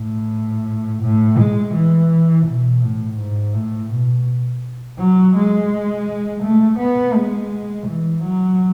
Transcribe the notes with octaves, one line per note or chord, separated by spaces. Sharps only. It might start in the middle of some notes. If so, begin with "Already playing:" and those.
Already playing: A2
A2
G#3
E3
B2
A2
G#2
A2
B2
F#3
G#3
A3
B3
G#3
E3
F#3